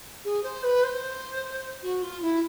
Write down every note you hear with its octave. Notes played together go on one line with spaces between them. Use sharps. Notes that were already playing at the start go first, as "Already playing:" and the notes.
G#4
C5
B4
C5
F#4
F4
E4